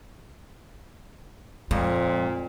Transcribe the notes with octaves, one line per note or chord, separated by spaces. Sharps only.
F2 A#2 G#3